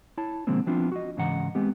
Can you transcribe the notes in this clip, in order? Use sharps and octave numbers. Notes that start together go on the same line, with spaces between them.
E4 C#5 A5
B2 D3 F3 G#3 A#3 C4
F3 B3 C4 D4 E4 F4
F#4 D#5
G#2 C#3 E3 D#5 F#5 A#5
G#3 B3 C4 G4